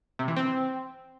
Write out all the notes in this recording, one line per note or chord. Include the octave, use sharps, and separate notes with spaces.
C3
E3
C4